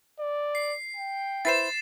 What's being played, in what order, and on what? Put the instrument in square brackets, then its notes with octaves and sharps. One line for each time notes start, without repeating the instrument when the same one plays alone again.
[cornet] D5
[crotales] C7
[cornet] G5
[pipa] E4 B4 C5 [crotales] A6 C7 E7